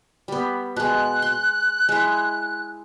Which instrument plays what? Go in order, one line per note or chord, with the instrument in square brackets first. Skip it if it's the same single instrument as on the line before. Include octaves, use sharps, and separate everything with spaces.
[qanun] G3 B3
[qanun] B2 G#3 [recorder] F#6
[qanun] C6
G#3 E4